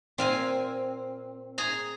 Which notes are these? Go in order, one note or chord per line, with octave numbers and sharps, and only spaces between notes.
A#2 C4 F5 G#5
G#4 G#5 A#5